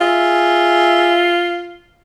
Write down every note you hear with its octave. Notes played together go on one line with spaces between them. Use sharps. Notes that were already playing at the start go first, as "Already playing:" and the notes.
F4 G#4 E5